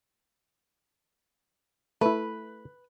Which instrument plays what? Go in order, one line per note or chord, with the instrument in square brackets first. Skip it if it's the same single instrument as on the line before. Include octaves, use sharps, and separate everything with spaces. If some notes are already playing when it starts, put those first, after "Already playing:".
[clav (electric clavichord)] A3 E4 [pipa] B4